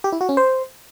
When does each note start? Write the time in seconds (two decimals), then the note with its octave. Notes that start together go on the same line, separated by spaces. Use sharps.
0.04 G4
0.12 E4
0.21 F#4
0.29 C#4
0.37 C5